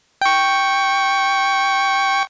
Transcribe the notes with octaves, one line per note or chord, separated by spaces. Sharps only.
G5 C#6